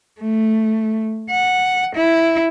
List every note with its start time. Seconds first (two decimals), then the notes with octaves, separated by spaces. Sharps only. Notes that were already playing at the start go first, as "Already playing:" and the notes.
0.21 A3
1.31 F#5
1.96 E4